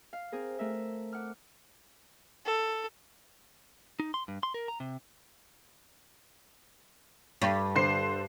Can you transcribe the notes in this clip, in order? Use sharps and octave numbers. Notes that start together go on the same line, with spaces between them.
F5
C4 G#4 A#4
A3 A#4 E5
F#5 D6 F6
A4
D#4
C6
G2
C6
A#4
A#5
C3
G2
D3 C5 C7